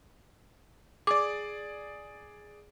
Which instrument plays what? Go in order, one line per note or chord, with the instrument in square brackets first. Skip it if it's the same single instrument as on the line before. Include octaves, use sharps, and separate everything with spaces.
[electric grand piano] G#4 D5 [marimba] D6